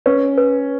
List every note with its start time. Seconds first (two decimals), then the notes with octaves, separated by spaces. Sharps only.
0.06 C#4 B4
0.38 B4